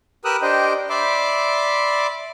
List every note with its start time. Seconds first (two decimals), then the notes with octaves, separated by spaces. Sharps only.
0.25 G4 A#4 B4 D#6 E6 F#6
0.42 D4 G4 C5 D#5 G5
0.90 D5 E5 B5 C6 D6